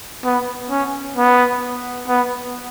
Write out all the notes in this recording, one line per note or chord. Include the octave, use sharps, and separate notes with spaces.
B3
C#4
B3
B3